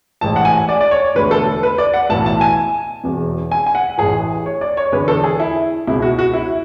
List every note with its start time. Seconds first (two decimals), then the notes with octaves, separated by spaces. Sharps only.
0.21 A1 G#2 E3 A5
0.36 F#5
0.45 G#5
0.69 D5
0.81 D5
0.91 C#5
1.15 E1 D2 D3 B4
1.31 A4
1.63 B4
1.78 D5
1.94 F#5
2.09 B1 A2 E3 A5
2.26 A5
2.41 G#5
3.04 E1 E2 B2
3.51 G#5
3.66 G#5
3.75 F#5
3.98 A1 A2 E3 G#4
4.46 C#5
4.61 D5
4.77 C#5
4.92 E1 E2 D3 B4
5.08 A4
5.24 G#4
5.40 E4
5.87 C#2 B2 E4
6.02 F#4
6.19 F#4
6.34 E4